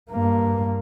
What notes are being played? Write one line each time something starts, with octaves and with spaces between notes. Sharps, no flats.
G2 A#3